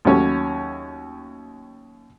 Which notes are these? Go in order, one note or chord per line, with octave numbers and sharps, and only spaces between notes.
D#2 F#3 A3 C#4 C#5